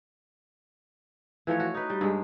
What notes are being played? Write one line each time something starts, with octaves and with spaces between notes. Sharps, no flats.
E3 F3 A3 C#5
F#4
D#4 B4
G3
G2 G#3